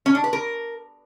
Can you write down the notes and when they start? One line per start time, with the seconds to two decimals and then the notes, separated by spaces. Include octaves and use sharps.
0.06 C#4
0.15 D4
0.24 B4
0.33 A#4